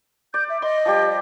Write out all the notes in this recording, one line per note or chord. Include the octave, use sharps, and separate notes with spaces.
D5 G6
E5
D5 D#5 C6 D6
F3 G3 G4